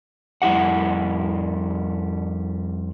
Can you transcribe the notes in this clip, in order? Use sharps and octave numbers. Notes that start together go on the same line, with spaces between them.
F2 G3 E4 G4 F#5